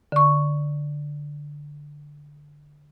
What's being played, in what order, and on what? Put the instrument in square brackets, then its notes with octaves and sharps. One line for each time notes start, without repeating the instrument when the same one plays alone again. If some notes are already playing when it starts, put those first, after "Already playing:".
[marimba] D3 C#6